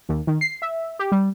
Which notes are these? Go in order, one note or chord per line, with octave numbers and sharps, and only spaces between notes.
D#2
D#3
C7
E5
G4
G3